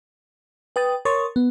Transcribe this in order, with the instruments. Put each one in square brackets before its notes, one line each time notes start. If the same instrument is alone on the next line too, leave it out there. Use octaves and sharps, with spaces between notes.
[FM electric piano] B4 G5 D#6 A6
A#4 C#5 C6 C#6 D#6 A6
B3